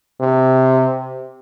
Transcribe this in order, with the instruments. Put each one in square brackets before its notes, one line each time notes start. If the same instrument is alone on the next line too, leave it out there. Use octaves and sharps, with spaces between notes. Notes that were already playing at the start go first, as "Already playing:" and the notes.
[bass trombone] C3